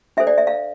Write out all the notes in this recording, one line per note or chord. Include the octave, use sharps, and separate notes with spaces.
D4 A4 C5 E5
D5
E5
F5